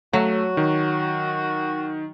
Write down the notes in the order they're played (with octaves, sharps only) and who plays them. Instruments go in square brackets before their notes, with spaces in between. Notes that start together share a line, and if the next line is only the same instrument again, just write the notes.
[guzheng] F#3 [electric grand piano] A3 [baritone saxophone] F#4
[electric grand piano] D#3